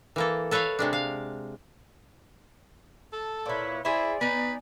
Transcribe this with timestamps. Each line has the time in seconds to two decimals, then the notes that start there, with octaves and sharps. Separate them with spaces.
0.16 E3 A#3 A4
0.51 A4 B4 C#5 E5 F5
0.79 C3 G#3 D4
0.93 F5
3.13 A4 A5
3.46 A#2 E4 B4 C#5
3.85 E4 G#4 C5 D5 E5 G#5
4.21 B3 D#4 B4